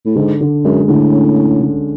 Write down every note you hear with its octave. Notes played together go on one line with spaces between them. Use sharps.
A2
G#2 D3
D3
F#2 G#3
A2 D3
C#4
C#4
D3